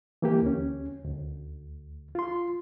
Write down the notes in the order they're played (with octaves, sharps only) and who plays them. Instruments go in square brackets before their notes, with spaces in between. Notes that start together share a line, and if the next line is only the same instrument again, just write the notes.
[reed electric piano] E3 A#3 G4
D2 C#4
D2
F4 C6